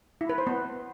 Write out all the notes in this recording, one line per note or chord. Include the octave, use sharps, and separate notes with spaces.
E4
B4
C5
B3